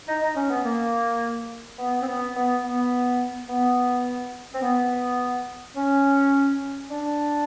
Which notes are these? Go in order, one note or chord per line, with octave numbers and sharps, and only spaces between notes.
D#4
D#4
C#4
B3
A#3
B3
C4
B3
B3
B3
B3
C4
B3
C#4
D4